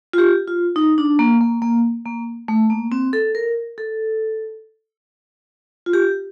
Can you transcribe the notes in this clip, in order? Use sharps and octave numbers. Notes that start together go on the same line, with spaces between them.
F4
G4
F4
D#4
D4
A#3
A#3
A#3
A#3
A3
A#3
C4
A4
A#4
A4
F4
G4